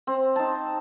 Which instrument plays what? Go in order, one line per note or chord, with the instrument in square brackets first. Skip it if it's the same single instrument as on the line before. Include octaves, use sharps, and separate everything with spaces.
[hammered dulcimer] C4
D#4 A5